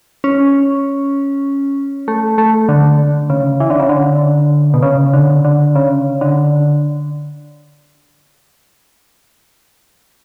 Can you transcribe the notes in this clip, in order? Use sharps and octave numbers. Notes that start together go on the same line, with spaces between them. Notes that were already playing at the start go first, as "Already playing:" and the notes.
C#4
A3
A3
D3
C#3
E3
D3
C#3
D3
B2
C#3
D3
D3
C#3
D3